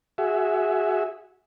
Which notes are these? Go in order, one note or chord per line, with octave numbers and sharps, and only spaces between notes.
F#4 G#4 E5